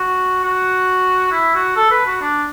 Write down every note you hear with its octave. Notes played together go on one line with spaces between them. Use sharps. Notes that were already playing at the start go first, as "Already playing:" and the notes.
Already playing: F#4
F#4
E4
F#4
A4
B4
F#4
D4